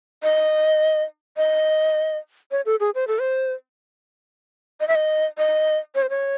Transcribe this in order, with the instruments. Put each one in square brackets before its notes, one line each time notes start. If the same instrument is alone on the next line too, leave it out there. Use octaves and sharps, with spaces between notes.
[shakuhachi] D#5
D#5
C#5
A4
G#4
C5
A4
C5
D#5
E5
D#5
D#5
C#5
C5
C#5